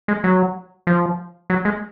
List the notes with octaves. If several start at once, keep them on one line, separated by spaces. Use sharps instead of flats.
G#3
F#3
F3
F#3
G#3